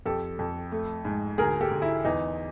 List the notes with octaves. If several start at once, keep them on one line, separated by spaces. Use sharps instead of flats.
F2 G4 A4
F2
A3
G#2
D2 G#4 A#4
G4 A4
D2
E4
E2 D#4